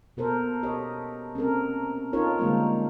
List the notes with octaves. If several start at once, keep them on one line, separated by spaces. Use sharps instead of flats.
B2 A4 A#4 C5
G4 A4 C#5 D#5
C4 C#4 A4 A#4
D#4 F4 A4 A#4 C#5
D3 G3 G#3 A#3 C5